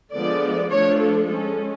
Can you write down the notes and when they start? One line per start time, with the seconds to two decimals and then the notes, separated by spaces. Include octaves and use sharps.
0.14 D3 F3 G#3 B3 D5
0.71 F3 A3 D4 C#5
0.99 A4
1.27 G#3 C#4 A4